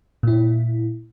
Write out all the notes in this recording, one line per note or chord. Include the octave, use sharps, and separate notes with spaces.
A#2 E4